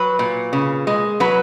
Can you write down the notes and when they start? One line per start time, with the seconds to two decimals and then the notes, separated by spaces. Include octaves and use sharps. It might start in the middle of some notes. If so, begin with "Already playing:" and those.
Already playing: F#3 B4
0.19 A#2
0.53 C#3
0.87 G#3
1.20 F#3 B4